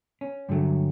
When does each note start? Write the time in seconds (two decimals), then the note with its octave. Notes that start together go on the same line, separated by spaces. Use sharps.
0.21 C#4
0.49 G2 D3 F#3 A3